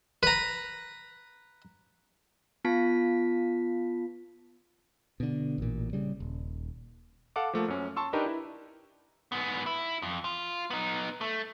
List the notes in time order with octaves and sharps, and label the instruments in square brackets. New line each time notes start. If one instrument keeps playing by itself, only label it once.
[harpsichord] B4 A#5
[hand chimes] B3 F4 A5 B6
[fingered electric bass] B2 D3
A1 A#2
C#3 G3
D#1
[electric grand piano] A4 F5 F#5 A5 D6
F3 A3 A#3
F#2 C#4
A5 C6 C#6 E6
D4 D#4 G4 A#4 B4
E4
[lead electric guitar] G#2 B3
E4
F2
F4
B3 D#4
A3